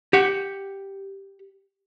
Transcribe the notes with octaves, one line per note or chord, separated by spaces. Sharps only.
G4 F#5